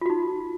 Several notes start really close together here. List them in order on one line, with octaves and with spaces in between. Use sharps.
F4 F#4 D#4